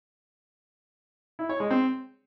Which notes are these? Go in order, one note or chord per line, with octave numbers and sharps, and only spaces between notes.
E4
C#5
G#3
C4